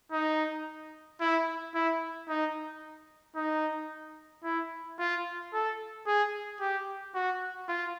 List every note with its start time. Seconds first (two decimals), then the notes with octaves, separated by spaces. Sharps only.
0.12 D#4
1.21 E4
1.75 E4
2.29 D#4
3.36 D#4
4.44 E4
4.99 F4
5.53 A4
6.07 G#4
6.61 G4
7.15 F#4
7.68 F4